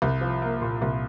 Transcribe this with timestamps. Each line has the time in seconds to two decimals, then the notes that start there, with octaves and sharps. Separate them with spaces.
0.02 C2
0.21 F3
0.42 A#3
0.62 A#2
0.82 C2